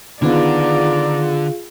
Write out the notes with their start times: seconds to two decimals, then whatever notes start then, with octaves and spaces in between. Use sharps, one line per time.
0.22 D3 D#3 B3 F4 G#4 D5 F5 A#5